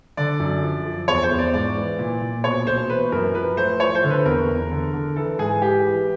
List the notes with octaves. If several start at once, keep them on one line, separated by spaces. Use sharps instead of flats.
D3 D5
F#2
F3
F3
E2 C#5
C5
E2
D5
G#2 D5
E3
A#2
A#2
B2 C#5
B2 C5
E3 B4
F#2 A#4
F3 B4
A2 C5
F3 C#5
C5
D3
B4
E2 A#4
E2
D3
D3
E3 A4
G#2 G#4
E3 G4
E3